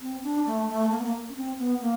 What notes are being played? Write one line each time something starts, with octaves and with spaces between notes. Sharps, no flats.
C4
D4
A3
A3
A#3
B3
A#3
C#4
C4
B3
A#3